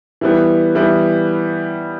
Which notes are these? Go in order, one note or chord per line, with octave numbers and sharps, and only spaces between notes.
E3 G3 B3
E3 G3 B3